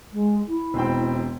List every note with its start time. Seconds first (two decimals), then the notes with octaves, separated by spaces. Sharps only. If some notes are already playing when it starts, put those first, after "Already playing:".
0.12 G#3
0.47 E4
0.74 E1 C4 G5